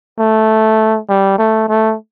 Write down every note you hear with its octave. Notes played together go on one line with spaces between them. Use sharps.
A3
G3
A3
A3